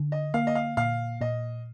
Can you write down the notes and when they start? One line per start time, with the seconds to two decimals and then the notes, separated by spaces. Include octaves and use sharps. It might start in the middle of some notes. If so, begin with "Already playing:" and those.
Already playing: D3
0.12 D#5
0.34 A#3 F5
0.47 D#5
0.55 F5
0.77 A#2 F5
1.21 A#2 D#5